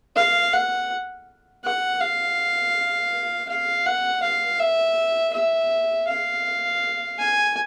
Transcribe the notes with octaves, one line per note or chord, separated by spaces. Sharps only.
F5
F#5
F#5
F5
F5
F#5
F5
E5
E5
F5
G#5